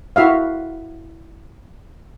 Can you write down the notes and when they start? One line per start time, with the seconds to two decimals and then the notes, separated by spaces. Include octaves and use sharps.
0.16 E4 F#4 E5 F5